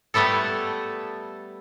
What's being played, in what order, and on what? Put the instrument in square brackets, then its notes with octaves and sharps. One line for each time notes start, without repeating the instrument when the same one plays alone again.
[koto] G3 A3 B3 E4 A4